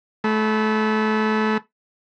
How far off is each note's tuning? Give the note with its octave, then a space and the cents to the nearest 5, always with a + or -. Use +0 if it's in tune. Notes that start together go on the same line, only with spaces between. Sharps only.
A3 -25 B5 +0